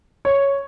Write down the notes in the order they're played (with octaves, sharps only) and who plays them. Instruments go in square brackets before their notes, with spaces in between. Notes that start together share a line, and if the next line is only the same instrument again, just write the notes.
[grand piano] C#5